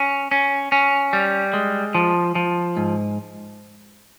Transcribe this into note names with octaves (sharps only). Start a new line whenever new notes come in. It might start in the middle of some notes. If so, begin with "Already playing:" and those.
Already playing: C#4
C#4
C#4
G3
G#3
F3
F3
G#2